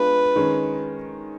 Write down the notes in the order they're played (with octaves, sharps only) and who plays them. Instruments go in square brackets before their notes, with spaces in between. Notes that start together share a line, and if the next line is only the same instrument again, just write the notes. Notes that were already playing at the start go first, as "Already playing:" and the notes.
Already playing: [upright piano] G#3 B3 D4 F4 [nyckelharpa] B4
[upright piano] D#3 G#3 C#4